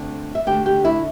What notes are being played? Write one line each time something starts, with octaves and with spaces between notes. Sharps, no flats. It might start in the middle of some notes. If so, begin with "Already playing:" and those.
Already playing: D2 D3 A3 C4
E5
D2 D3 A3 G4 G5
G4 G5
E4 E5